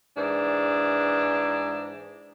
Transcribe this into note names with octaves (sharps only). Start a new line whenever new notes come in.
G#2 E3 D4